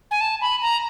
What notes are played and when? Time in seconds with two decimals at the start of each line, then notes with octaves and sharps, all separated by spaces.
0.11 G#5
0.21 A5
0.42 B5
0.62 A#5